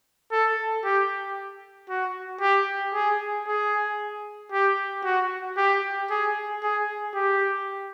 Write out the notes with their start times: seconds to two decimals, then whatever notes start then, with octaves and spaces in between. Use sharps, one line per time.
0.32 A4
0.84 G4
1.89 F#4
2.41 G4
2.94 G#4
3.47 G#4
4.52 G4
5.04 F#4
5.57 G4
6.10 G#4
6.63 G#4
7.15 G4